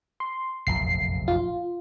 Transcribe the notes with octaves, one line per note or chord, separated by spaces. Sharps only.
C6
F1 A#1 F#2 C7
F4